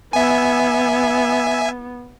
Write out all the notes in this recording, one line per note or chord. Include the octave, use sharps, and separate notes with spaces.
B3 E5 G#5